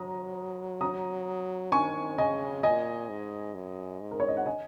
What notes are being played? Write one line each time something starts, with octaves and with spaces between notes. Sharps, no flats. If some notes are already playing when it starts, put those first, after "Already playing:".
Already playing: F#3 A#5 D#6
A#5 D#6
D#3 G#5 C#6
C#3 D#5 G#5
A#2 D#5 G#5
G#2
F#2
G#2
A#4
C#5
D#5
F#5
D#5 G#5